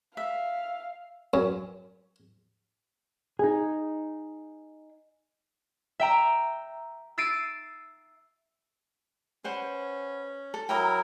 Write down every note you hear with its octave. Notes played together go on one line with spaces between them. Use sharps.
E5 F5
F#2
D#4 G#4
E5 G5 A#5
E6 A6 C7 D7 D#7
C#4 B4 C5 F#5
A4
F#3 E4 A#4 G5 A#5 D#6